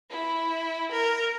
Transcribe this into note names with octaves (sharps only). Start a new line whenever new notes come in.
E4
A#4